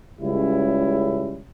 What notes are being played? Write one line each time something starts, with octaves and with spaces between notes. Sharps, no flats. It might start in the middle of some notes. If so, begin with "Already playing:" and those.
C#2 C#3 G3 C#4 E4